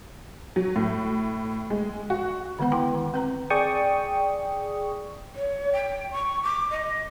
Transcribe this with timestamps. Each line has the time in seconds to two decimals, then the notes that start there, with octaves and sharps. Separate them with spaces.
0.56 F#3
0.76 A2
1.70 G#3
2.10 F#4
2.59 D3 D#3 G#3 B3 B4 F#5
2.72 E4 B4 G5 C6 D6
2.94 D#3
3.14 C4 B4 A#5
3.50 G#4 D5 G5 C#6 D#6
5.35 C#5
5.72 G5
6.12 C#6
6.43 D6
6.70 D#5